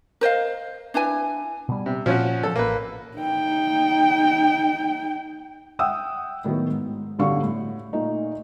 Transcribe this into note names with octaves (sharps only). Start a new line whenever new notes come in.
A#4 C5 D#5 F5
D4 E4 B4 G#5
B2 G3
C3
A#2 F3 C#4 F#4
F3 A3 C#4 A4
A1 A#3 B4
D#4 G5
E5 F#5 G5 D#6 E6
A2 D#3 F#3 B3
G#2
A1 G2 B2 D3 F5 C#6
A2
A#2 A3 D#4